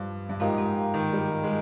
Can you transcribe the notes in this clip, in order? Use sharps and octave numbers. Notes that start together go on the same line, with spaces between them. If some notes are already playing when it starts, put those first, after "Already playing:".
Already playing: G2 F3
G2
G#2 F3 A#3 D#4 G4
G#2
D#3
G3
G#3